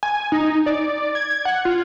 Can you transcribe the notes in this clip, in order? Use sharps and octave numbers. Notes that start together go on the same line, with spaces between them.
G#5
D#4
D5
G#6
F#5
F4